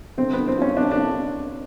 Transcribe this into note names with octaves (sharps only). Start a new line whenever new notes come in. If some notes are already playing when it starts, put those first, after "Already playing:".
D3 C4
D3 B3
C4
F3 C#4
F2 D4
D4